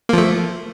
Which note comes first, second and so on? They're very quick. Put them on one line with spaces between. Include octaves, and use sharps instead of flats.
A#3 F3 A3